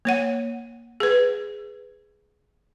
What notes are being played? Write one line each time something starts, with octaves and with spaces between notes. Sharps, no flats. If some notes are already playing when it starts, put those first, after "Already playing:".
A#3 C#5 F#5
G#4 B4